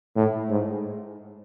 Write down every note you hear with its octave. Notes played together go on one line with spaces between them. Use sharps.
A2
G#2